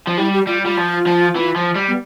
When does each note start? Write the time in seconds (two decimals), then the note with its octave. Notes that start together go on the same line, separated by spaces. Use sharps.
0.07 F3
0.18 G3 E4
0.33 G4
0.47 G3 F4
0.63 G3 F4
0.77 F3
1.07 F3
1.36 E3
1.56 F3
1.76 G3
1.88 B3